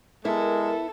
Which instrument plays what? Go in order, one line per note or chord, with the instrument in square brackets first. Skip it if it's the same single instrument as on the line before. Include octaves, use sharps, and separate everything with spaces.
[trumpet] G#3 [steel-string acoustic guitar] B3 E4 [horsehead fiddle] A4 [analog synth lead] A#4